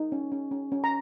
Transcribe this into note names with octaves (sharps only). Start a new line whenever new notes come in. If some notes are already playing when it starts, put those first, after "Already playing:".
Already playing: D#4
C#4
C#4
C#4
C#4
A#5